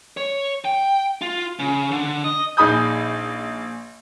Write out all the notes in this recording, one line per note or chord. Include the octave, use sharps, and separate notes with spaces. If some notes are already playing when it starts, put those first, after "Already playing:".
C#5
G5
F4
C#3
D3
D#5
A#1 D#4 G#4 B5 D#6 G6